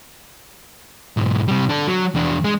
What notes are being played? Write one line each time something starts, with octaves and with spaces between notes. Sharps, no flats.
B1 G#2
C3 G3
D4 A4
F#3
E2 D4
G#3